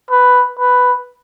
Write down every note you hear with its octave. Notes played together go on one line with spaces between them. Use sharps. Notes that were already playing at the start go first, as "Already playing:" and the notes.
B4
B4